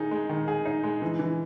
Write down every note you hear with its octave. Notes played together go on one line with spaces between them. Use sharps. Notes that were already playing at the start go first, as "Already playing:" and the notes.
Already playing: D#3 D#4 G#4
G#3
D#3
G#4
D#4
G#3
E3
E3